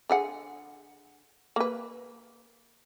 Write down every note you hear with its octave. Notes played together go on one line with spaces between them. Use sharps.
D3 G#4 F#5
A#3 B4